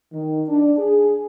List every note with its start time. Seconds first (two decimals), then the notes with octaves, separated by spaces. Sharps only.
0.13 D#3
0.49 D4
0.78 G#4